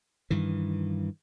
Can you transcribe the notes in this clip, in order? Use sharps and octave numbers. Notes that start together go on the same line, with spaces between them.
G2 D#3 E3